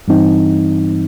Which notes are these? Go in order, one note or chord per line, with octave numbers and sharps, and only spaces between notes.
G2 E3 G3 C4 D#4